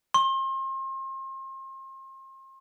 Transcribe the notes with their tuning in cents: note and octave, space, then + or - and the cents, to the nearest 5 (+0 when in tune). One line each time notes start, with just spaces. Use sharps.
C6 +35